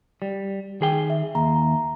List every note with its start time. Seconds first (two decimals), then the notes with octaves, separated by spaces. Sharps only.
0.22 G3
0.81 D#3 G#4 G5
1.10 E5
1.35 D#2 A#5